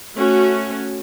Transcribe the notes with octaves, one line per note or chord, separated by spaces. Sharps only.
A3 C#4 F#4